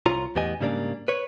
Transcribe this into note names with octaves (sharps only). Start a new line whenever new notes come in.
C2 F4 C#5 A#5
E2 A2 B3 G4 D#5 G#5
G#2 C#3 G3 A#3 D4
B4 C#5